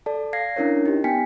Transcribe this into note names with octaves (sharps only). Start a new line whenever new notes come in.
A4 D5 A5
F5 G#6 A#6 C7
C#4 D4 E4 A#4 C#5
D#4 G4
B3 G5 G#5 B6 C#7